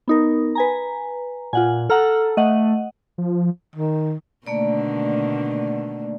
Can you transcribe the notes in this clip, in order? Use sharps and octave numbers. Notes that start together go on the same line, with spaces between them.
B3 D#4 A#4
B4 G#5 A#5
A#2 F4 F#5 G#5
A4 F#5 A#5 F6
A3 D#5 F#5
F3
D#3
B2 D3 D#3 A3 A#3 D5